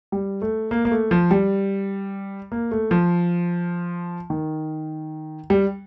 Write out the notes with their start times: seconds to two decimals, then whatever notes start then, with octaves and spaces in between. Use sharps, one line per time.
0.12 G3
0.42 A3
0.71 A#3
0.85 A#3
0.91 A3
1.11 F3
1.31 G3
2.52 A#3
2.71 A3
2.91 F3
4.30 D#3
5.50 G3